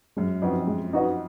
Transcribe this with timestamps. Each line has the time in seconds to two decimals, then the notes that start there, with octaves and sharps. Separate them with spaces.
0.17 F#2 G#3
0.42 F2 D#4 F#4 B4 D#5
0.67 G#3
0.93 D#4 F#4 B4 D#5